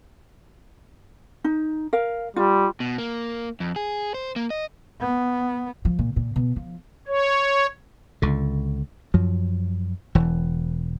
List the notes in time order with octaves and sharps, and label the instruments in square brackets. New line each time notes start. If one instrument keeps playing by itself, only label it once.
[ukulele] D#4
A#4 F5
[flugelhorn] G3 [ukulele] F4
[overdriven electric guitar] B2
A#3
F2
G#4
C5
A#3
D#5
[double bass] B3
[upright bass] F3
A#2
A#2
B2
F3
[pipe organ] C#5
[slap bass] C#2 D3
F#2 F3 F#3
E1 E3